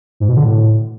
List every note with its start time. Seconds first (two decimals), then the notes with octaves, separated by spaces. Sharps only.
0.20 G#2
0.29 B2
0.37 D3
0.45 A2